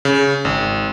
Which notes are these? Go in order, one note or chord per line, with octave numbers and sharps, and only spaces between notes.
C#3
G#1